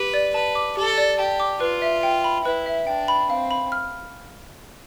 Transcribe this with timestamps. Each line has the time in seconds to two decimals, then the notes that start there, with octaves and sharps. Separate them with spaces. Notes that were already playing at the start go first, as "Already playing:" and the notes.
Already playing: G4 B4
0.14 D5
0.34 B4 A5
0.55 D6
0.77 G4 A4
0.98 D5
1.19 G4 A5
1.40 D6
1.60 F4 B4
1.82 E5
2.03 G5
2.24 B5
2.45 E4 B4
2.66 E5
2.87 D4 G5
3.08 B5
3.30 C4 F5
3.51 B5
3.72 F6